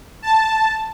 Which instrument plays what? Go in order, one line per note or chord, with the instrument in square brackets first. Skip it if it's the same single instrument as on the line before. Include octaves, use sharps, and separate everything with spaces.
[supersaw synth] A5